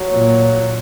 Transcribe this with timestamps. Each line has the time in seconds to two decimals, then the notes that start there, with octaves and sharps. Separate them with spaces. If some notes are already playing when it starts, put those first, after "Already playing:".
Already playing: F#3
0.11 A#2